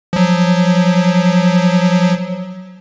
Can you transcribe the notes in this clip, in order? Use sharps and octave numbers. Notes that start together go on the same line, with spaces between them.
F3 F#3